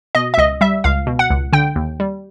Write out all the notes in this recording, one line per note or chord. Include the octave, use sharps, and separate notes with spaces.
B2 D#5
E5
C#2 D#5
G3 E5
C#2 F5
B2
F#5
C#2
D3 G5
D#2
G3